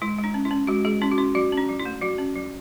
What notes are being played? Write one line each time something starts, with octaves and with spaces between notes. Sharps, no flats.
G#3 E4
G#3
D4
C#4
E4
C#4
G#3 F#4
G#3 G#4
C#4 E4
F#4
C#4 E4
F#3 F#4
C#4
D4
F#3
E4
A3
F#3 F#4
C#4
F#3